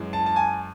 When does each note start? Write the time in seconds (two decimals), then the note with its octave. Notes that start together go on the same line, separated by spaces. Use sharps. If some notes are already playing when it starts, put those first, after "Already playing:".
Already playing: F#2 E3 G#3
0.13 A5
0.26 A5
0.36 G#5